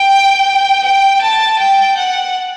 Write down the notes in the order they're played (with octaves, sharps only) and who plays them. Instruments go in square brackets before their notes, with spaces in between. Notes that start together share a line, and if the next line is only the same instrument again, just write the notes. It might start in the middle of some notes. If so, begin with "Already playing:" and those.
Already playing: [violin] G5
G5
A5
G5
F#5